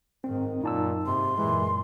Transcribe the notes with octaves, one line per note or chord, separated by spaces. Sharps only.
G#2 D#3 C4
F#2 A#2 D#4 A5 E6
G#2 C3 C6
F#2 A#2 E3 G#3